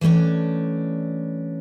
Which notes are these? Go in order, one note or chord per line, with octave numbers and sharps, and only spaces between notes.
E3 G3 A3 C#4 D4